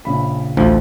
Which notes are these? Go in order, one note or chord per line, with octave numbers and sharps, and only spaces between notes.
A#1 C#3 B5
A1 D2 F3